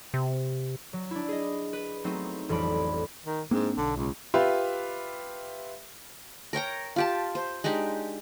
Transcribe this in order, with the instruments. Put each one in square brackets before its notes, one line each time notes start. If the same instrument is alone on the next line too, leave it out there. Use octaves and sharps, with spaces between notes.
[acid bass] C3
[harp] F#3
D4 E4
G#4 D#5
B4
F#3 A3 B3 C4 D#4
A1 F2 F3 G3 B5 D7
[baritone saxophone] D#3
[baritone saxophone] G#2 [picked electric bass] A#3 C4 D4
[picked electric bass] B1 [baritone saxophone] D3
[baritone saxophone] C#2
[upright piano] F4 G4 B4 E5
[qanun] A#4 C#5 G5 A#5
F4 G4 A5
C5
G#3 D4 D#4 G4